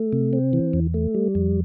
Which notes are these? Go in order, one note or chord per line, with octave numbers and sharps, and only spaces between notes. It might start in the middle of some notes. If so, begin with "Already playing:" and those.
Already playing: A3
C3
C4
E3
E2
A3
G3
F2